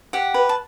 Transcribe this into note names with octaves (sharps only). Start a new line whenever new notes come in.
G4 F#5
B4
A5